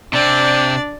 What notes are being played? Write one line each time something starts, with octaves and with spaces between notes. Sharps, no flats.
C3 C4 D4 D5 D6 G6